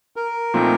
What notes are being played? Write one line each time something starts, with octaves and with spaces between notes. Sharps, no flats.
A#4
A#2 F3 A3 C4 D#4